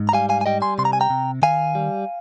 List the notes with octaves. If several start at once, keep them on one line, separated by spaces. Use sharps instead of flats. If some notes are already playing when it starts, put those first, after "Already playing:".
Already playing: G#2
A#5
G3 F5 G#5
F5 G#5
G#5
G3 D#5 G5
G#5 C6
C3 C6
A#5
G#5
G5 A#5
C3
D#3 F5 G#5
G3